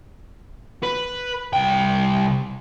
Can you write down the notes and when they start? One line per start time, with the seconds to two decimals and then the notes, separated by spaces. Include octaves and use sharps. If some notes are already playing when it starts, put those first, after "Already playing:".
0.83 B4
1.53 C2 G5